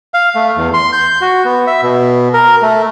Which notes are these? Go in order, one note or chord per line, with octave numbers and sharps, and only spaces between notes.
F5
A3
E2
C6
G6
F#4
B3
E5
B2
A#4
A3